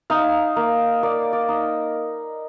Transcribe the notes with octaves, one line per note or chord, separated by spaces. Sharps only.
D#4 F5
A#3
A#3 D5
D5
D#4